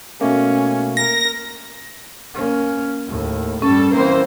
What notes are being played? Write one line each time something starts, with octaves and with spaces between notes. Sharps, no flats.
B2 A3 A#3 C#4
A#4 A#6
A#3 C#4
D#2 A2
G2 G3 C#4 A4
E3 A#3 C4 C5